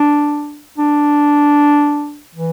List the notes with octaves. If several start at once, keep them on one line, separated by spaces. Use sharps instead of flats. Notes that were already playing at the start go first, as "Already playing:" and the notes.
Already playing: D4
D4
E3